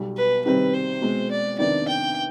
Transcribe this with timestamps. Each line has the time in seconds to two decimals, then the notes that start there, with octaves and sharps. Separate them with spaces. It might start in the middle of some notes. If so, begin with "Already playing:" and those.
Already playing: B1 B2 G3
0.17 B4
0.45 C3 D#3 G3 C4 B4
0.74 C5
1.02 B2 G#3 C4
1.31 D5
1.59 F2 C3 D#3 B3 D4 D5
1.88 G5